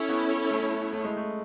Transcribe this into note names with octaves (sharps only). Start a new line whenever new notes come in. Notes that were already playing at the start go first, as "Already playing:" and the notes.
Already playing: C#4 E4 A4 C#5
B3
A3
A3
G#3
A3